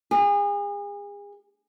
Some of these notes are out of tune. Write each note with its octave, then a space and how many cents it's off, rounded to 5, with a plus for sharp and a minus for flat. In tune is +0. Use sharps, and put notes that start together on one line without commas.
G#4 -35